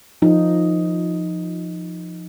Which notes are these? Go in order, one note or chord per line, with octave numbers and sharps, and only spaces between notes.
F3 D#4